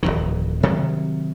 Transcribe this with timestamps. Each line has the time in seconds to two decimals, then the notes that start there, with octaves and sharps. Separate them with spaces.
0.03 D1 A#1 F2 D#3
0.63 C3 D#3 F#3